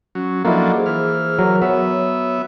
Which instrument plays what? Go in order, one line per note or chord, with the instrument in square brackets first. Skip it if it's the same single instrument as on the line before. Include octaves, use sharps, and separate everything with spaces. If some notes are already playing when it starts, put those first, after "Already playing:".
[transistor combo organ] F#3 [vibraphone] C#4
[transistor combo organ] F3 F#3 D4 [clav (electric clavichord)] A#3 E4 [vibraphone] A4 D#5 F#5
[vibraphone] G#4 C5
[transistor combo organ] E3 F6
[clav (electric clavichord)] F#3 [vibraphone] G#4 A#4
[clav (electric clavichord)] F#3 [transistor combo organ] B3 E5 [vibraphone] C#5